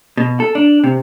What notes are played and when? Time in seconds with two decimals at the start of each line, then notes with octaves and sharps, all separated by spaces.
0.17 B2
0.40 A4
0.55 D4
0.84 C3